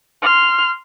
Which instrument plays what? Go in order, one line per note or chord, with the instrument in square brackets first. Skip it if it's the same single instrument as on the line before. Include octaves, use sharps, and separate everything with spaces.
[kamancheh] C6 F6